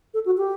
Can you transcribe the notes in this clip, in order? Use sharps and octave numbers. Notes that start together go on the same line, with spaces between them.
A4
F#4
G4